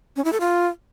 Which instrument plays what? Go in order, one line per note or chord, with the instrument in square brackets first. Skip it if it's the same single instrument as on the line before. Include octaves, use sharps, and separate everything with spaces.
[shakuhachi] C#4
E4
A4
F4